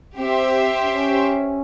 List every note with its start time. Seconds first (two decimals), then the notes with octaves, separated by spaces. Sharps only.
0.17 C4 G4 C5 E5
0.83 C#4